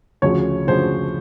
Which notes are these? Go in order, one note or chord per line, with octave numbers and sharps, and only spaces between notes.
D2 C#3 F3 C#5
D2 C#3 F3 C5